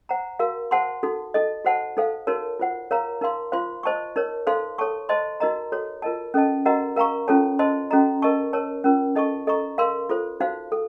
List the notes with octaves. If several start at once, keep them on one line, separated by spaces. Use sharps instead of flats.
C5 F#5 A#5
F#4 A#4 F5
C5 F#5 A5 C6
D#4 F#4 A4
D#4 A4 D#5
F#4 C5 F#5 A5
D#4 A4 C5 F5
D#4 F#4 A#4 C#5 A5
F4 C5 F#5
A#4 C#5 F5 A#5
D#4 A#4 F5 C6
F4 C5 F5 C6
C5 D#5 A5 C#6
D#4 A#4 C#5
D#4 A4 C5 F5 C6
A4 C#5 A5 C#6
C5 D#5 A5 C6
D#4 F#4 A#4 D#5 A#5
F#4 A4 C#5
F4 A#4 D#5 A5
C#4 A4 D#5 A5
F#4 A#4 D#5 F#5 A#5
A#4 F5 A#5 C#6
C#4 F4 A4 C#5 A5
C5 D#5 A5 C6
C#4 F#4 A4 D#5 A#5
A#4 D#5 A5 C#6
A#4 C#5 A5
C#4 F4 A#4
D#4 A4 D#5 A5 C#6
A4 D#5 A#5 C#6
A#4 F5 C6
F4 A4 C5
D#4 F#4 C5 F5
A4